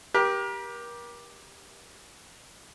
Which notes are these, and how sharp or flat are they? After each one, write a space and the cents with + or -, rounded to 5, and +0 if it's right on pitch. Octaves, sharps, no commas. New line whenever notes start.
G4 +0 A#4 +35